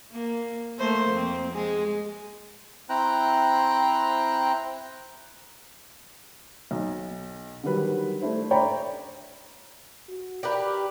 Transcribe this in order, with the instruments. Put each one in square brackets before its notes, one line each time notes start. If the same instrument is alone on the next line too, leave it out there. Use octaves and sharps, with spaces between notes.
[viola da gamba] A#3
A3 A#3 C5
F2 C4
G#3 G#4
[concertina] C4 E4 C5 G5 A#5 F#6
[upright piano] B1
D3 D#3 F#3 G3 B4
A3 D4 E4 C5
C#5 D5 G5 A#5 B5
[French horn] F#4
[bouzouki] G4 A#4 B4 [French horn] D5